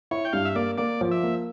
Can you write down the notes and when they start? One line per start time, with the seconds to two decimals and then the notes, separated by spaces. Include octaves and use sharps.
0.11 E4 C#5
0.25 G5
0.33 G2 F5
0.45 E5
0.55 A#3 D5
0.78 A#3 D5
1.01 F3
1.11 E5
1.23 A#3